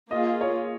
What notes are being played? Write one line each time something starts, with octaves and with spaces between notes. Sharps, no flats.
A#3 F4 G#4 D#5
C#5